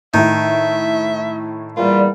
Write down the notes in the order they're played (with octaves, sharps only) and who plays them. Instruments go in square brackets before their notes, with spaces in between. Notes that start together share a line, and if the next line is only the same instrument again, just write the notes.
[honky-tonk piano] A2 E4 [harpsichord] D#3 [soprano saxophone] E5
[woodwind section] E2 A#2 G3 [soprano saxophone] F4